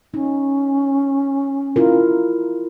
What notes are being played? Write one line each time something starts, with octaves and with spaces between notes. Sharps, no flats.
C#4 D#4
E4 F4 A#4